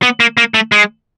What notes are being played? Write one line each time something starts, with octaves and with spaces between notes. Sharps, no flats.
B3
A#3
A#3
A3
G#3